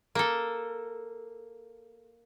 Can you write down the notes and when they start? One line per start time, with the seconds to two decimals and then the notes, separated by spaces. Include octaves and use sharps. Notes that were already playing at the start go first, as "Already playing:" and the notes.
0.15 A#3 A4